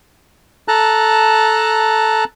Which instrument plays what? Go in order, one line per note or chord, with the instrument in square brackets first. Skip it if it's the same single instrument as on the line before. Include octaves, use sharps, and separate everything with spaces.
[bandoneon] A4 A5 A#5 F#6